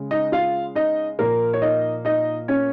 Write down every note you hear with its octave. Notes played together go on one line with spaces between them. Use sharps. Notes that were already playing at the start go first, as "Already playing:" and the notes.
Already playing: C#3 G#3
D#4 D#5
F4 F5
D#4 D#5
A#2 F3 A#3 A#4
C#5
D#4 D#5
D#4 D#5
C#4 C#5